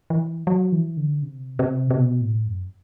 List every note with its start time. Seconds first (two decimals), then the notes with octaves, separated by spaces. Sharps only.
0.10 E3
0.47 F#3
0.72 E3
0.97 D3
1.22 C3
1.59 C3
1.91 C3
1.97 B2
2.21 A2
2.46 F#2